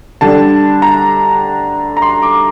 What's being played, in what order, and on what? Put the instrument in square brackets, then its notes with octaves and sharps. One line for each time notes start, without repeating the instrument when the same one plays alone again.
[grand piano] D3 G3 D4 A5
A#5
A#5
C6
D6